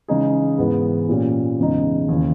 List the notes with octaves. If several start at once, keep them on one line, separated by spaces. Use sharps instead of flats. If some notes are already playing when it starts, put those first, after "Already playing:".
C#3 E3 G#3 D#4 G#4
G#2 E3 G#3 B3
A#2 A#3 C#4 G4
E2 C#3 G#3 D#4
D#2 C#3 E3